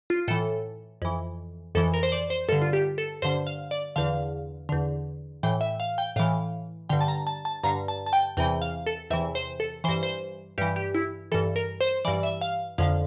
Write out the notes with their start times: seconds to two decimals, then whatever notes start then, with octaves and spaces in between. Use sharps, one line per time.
0.10 F4
0.28 A2 E3 A4
1.02 F2 E3
1.75 F2 E3 A4
1.94 A#4
2.03 C5
2.12 D5
2.30 C5
2.49 G2 D3 A4
2.61 F4
2.73 G4
2.98 A4
3.22 G2 D3 C5
3.47 F5
3.71 D5
3.96 E2 D3 F5
4.69 E2 D3
5.43 A2 E3 G5
5.61 E5
5.80 F5
5.98 G5
6.16 A2 E3 F5
6.89 G2 D3 G5
7.01 A5
7.08 A#5
7.27 A5
7.45 A5
7.63 G2 D3 A#5
7.88 A5
8.06 A5
8.13 G5
8.37 E2 C3 E3 G5
8.62 F5
8.87 A4
9.10 E2 C3 E3 E5
9.35 C5
9.60 A4
9.84 E3 C5
9.88 G2
10.03 C5
10.58 G2 E3 G4
10.76 G4
10.95 E4
11.32 E3 A4
11.34 G2
11.56 A#4
11.81 C5
12.05 G2 E3 D5
12.23 E5
12.41 F5
12.78 F2 D3 F5